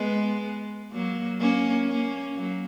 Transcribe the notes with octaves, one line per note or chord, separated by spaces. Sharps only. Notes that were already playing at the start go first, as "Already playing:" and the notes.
Already playing: G#3 B3
F#3 A#3
A#3 C#4
A#3 C#4
F#3 A#3